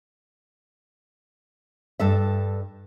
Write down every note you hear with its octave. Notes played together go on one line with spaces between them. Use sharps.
G2 A4 E5